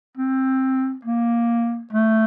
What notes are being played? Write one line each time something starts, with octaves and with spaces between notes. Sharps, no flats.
C4
A#3
A3